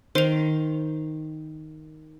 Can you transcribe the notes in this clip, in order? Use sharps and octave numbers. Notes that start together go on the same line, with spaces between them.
D#3 C5 C6 F7